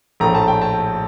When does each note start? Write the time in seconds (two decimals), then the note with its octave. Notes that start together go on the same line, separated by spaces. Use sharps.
0.20 A#1 A2 A3 A#5
0.35 A5
0.48 G5
0.62 A5